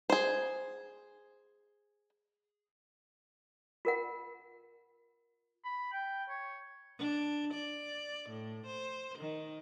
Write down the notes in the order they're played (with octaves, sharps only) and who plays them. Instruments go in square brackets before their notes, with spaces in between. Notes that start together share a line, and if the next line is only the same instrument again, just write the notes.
[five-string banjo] G#4 C5
[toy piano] F4 A#4 F#5
[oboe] B5
G5
C#5
[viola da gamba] D4
D5
A2
C5
D#3